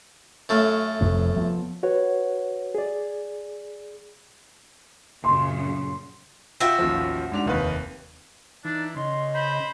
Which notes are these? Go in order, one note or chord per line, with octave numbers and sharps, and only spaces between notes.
F#2 A3 F5
F1 F2 B3
F3 B3
F#4 B4 C#5 F#5
G#4 D5
F#2 A#2 C#3 C6
F4 F#4 E5 G5
A1 D#2 F3
G#2 D4 F7
F1 D#2 B4
E3 D4 D#4
C#3 D#5 C6
C5 B5